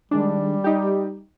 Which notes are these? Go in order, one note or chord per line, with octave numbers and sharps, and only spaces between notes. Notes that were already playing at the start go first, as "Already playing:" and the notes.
D#3 G3 G#3 D4
D#4 G4